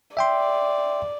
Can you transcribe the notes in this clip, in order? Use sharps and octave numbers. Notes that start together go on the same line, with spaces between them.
D5 E5 G5 C6